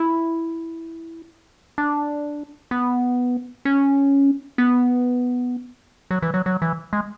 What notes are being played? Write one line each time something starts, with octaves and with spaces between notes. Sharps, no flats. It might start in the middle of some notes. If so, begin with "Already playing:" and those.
Already playing: E4
D4
B3
C#4
B3
F#3
E3
F#3
F#3
E3
G#3